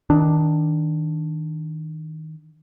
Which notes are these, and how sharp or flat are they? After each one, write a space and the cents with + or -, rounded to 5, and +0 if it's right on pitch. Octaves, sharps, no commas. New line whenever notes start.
D#3 +20 D4 +0